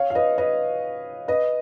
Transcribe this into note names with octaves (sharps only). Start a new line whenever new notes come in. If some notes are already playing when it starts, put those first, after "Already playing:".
Already playing: C#5 F5
F5
B4 D#5
B4 D#5
B4 D#5